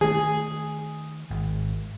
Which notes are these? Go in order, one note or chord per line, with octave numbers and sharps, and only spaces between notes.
D#3 A3 G#4
G#1